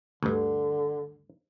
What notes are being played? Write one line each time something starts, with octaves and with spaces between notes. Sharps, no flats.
D2 G2 D3